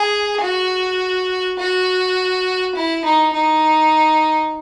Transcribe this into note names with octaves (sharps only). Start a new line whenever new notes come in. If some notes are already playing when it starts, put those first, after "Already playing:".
Already playing: G#4
F#4
F#4
E4
D#4
D#4